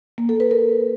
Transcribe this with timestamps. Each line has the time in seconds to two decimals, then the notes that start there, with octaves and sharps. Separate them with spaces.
0.18 A#3
0.29 A4
0.40 B4
0.51 A#4